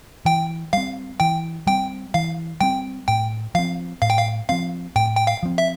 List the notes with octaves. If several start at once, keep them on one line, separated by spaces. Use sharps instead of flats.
E3 G5
G3 C4 F5
E3 G5
G3 C4 G5
E3 F5
G3 C4 G5
A2 G5
F3 C4 F5
A2 F5
G5
F5
F3 C4 F5
A2 G5
G5
F5
F3 C4
E5